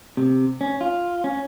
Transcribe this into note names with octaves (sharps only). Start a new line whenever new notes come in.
C3
C#4
F4
C#4